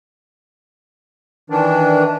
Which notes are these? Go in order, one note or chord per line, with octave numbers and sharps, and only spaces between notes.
D#3 E3 D4